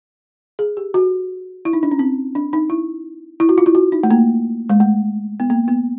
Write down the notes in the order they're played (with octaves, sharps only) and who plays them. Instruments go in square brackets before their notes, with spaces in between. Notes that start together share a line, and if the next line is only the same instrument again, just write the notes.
[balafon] G#4
G4
F#4
E4
D#4
D4
C#4
C4
D4
D#4
E4
E4
F#4
F4
E4
F#4
D#4
A3
A#3
G#3
A3
B3
A#3
B3